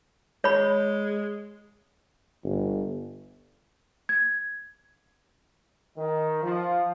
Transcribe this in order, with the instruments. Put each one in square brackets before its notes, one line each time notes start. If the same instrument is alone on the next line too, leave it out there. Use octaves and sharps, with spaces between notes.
[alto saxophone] G#3 [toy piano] C#5 B5
[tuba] G1
[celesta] G#6
[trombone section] D#3
F3